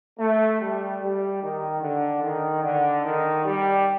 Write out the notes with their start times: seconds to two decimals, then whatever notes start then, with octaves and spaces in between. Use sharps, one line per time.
0.18 A3
0.60 G3
1.00 G3
1.41 D#3
1.82 D3
2.22 D#3
2.63 D3
3.03 D#3
3.45 G3